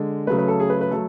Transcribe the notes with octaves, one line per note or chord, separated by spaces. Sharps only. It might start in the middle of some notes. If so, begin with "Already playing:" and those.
Already playing: D3 G#3
C#3 F#3 A3 B4
B4
A4
G#4
B4
B4
F#3 A3 A4